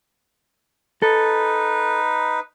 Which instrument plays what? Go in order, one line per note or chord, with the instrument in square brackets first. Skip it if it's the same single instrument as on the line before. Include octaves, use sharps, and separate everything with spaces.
[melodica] D#4 B4 [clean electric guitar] A4